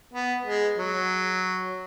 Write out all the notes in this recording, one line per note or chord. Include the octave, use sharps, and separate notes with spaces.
B3
G#3
F#3